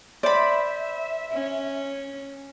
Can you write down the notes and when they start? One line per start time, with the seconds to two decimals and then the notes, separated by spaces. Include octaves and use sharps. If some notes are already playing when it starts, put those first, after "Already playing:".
0.23 C5 D5 E5 B5
1.33 C#4